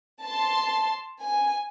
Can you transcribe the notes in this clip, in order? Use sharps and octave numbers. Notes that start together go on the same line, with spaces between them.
A5 C6
G#5